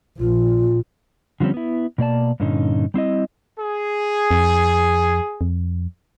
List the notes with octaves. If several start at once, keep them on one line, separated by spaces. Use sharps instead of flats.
A#1 F4
D3 F3 G3 C4 C#4
B3 E4
B2 A#3 D5 A5
G2 A#2 D3 C#4 D#4
G3 C4 E4 D#5
G#4
F2
F2